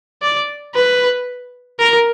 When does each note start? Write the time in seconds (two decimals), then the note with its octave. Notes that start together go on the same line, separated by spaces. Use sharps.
0.22 D5
0.74 B4
1.79 A#4